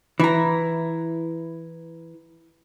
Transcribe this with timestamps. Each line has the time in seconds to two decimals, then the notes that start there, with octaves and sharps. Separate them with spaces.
0.20 E3 E4 A#5